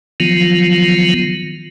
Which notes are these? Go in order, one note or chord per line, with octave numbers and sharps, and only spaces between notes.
D#3 F3 F#3 B3 F4